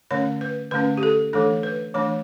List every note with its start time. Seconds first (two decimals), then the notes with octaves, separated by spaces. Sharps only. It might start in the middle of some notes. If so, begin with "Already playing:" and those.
0.11 D3 A3 C#4 C#5
0.41 B4
0.71 D3 A3 C#4 B4
0.97 G4
1.03 A4
1.33 E3 A3 D4 A4
1.63 B4
1.95 E3 A3 D4 C#5